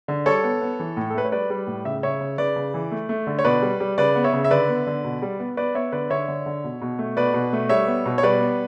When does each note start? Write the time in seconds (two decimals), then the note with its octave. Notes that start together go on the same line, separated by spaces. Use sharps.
0.08 D3
0.26 G3 A4 C#5
0.44 B3
0.61 B3
0.79 E3
0.97 A2
1.10 A4
1.14 A3 B4
1.25 C#5
1.32 G3 B4 D5
1.50 G3
1.67 A2
1.85 C#3 E5
2.03 C#3 C#5 E5
2.21 C#3
2.38 C#3 B4 D5
2.56 C#3
2.74 E3
2.91 A3
3.09 A3
3.27 D3
3.39 C#5
3.44 B2 B4 D5
3.62 G3
3.80 G3
3.98 C#3 B4 D5
4.16 B3
4.24 C#5 E5
4.33 C#3
4.44 E5
4.51 D3 B4 D5
4.68 B3
4.87 D3
5.04 B2
5.22 G3
5.39 B3
5.57 B3 B4 D5
5.75 B3 C#5 E5
5.92 D3 B4 D5
6.10 D3 C#5 E5
6.28 D3
6.46 D3
6.64 B2
6.82 B2
6.99 A3
7.17 B2 B4 D5
7.34 B2
7.53 A3
7.69 G3 C#5 E5
7.87 B3
8.06 B2
8.18 C#5
8.23 G3 B4 D5
8.41 B3